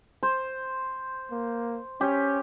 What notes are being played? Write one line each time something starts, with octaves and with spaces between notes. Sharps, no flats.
C5
A#3
C#4 G4